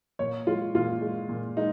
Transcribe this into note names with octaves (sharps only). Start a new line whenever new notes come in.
A#2 C#5
G#3 F4
A#2 F4
G#3
A#2
G#3 D#4